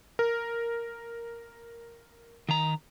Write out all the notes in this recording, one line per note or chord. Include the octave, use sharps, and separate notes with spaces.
A#4
D#3 A#5